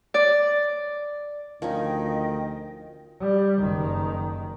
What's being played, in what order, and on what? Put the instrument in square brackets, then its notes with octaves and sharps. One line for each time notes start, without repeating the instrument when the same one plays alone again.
[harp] D5
[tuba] D2 [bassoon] D#3 [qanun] F3 C#4 D#4 [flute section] D#5 G5
[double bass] G3
F#1 D#3